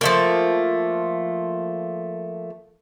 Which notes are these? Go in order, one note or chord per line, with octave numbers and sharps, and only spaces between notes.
F3 A3 A#3